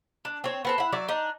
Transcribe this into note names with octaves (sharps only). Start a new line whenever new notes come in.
D4
C4 C#5
B3 C4 A4
E4 F#5
F#3 D5 E5
D4 D#4